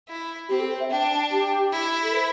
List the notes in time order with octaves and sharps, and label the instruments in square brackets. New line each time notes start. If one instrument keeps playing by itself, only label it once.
[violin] E4
[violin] C4 [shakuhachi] G4
[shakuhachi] A4
C5
E5
[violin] D4 [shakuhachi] G5
[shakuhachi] A5
G4
[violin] E4
[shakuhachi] A4
C5